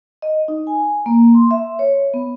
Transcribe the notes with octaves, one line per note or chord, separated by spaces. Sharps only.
D#5
D#4
G#5
A#3
C6
E5
C#5
B3